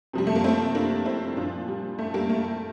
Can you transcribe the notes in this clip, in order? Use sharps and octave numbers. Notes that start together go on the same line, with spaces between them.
C3 F3 G3
A3
A#3
A3 C4
A#3 D4
C4 E4
A#2 F3 D4 F4
G3
A3
G3 A#3
A3